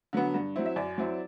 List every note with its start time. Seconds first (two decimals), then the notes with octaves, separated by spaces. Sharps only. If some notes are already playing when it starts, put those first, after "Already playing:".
0.13 D3 F#3 B3
0.34 G2
0.56 F#3 C4 E4
0.66 E5
0.76 F#2 D5
0.98 F#3 C4 E4